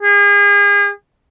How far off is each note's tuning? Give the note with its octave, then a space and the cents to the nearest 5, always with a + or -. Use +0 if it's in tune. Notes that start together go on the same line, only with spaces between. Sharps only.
G#4 -40